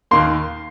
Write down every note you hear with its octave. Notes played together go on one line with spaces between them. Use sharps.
D#2 D#3 A#3 C6